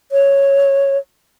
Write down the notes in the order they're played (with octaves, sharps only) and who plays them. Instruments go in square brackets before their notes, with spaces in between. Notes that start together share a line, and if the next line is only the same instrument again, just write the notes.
[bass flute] C#5